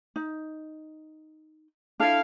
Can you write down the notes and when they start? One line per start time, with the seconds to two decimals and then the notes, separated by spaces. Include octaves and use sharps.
0.16 D#4
2.00 D4 E4 A4 F5